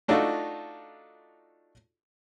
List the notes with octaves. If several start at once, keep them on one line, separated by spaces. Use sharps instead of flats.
A3 D4 D#4 F4 F#4 A4